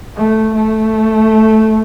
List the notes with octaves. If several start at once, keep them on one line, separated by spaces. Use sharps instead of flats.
A3
A3